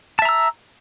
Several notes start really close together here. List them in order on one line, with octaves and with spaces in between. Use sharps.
A5 E5 A#5 E6